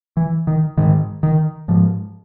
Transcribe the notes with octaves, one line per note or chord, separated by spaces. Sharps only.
E3
D#3
G#2 D#3
D#3
G#2 F3